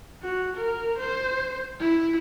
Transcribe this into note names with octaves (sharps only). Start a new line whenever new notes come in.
F#4
A#4
C5
E4